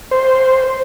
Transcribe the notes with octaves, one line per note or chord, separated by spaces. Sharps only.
C5